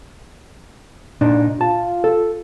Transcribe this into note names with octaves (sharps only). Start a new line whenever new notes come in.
A#2 D4 D#4
F4 A5
A4